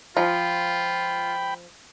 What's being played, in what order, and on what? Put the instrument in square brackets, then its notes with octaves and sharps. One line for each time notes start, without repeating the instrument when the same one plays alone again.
[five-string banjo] F3 [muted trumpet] F4 [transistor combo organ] G5 B5